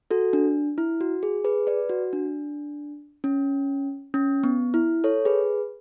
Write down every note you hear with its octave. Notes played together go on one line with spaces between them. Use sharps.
F#4 A4
D4
E4
F#4
G#4
G#4 B4
B4 D5
F#4
D4
C#4
C#4
B3
E4
A4 C#5
G#4 B4